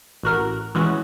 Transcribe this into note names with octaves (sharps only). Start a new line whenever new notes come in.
A1 F#4 A#4
E3 G#3 C#4 F#4